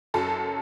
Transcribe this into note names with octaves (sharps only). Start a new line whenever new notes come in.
F#1 F#2 F#3 A4